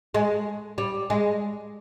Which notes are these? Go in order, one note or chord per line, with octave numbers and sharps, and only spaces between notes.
G#3
G3
G#3